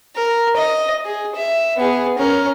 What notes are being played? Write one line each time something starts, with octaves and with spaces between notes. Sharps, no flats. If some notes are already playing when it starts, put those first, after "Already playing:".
A#4
D#5
G#4
E5
B3 G#4
C#4 A#4